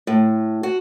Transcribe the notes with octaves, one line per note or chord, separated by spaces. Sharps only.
A2
F#4